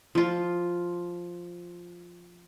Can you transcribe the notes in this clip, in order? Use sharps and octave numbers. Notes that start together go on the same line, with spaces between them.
F3 F4